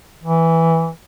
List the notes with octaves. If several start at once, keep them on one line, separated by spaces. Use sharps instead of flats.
E3